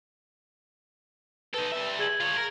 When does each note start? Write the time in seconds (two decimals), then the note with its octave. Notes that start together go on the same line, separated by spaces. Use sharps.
1.54 D#4 A4 B4
1.72 G3 E5
1.99 G#4 G#6 F#7
2.20 F4 C#5
2.36 A#4